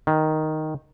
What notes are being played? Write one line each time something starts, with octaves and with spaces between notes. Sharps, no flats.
D#3